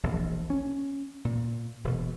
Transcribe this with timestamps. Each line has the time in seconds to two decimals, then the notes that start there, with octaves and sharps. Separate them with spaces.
0.03 E1 A#1 E2
0.50 C#4
1.25 A#2
1.84 E1 B2